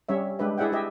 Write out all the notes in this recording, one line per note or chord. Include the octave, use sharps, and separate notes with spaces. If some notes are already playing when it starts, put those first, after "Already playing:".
G3 C#4 C#5 E5
G#3 D4 G4 B4 E5
E4 G#4 D5 E5 F#5 G5
G4 D#5 E5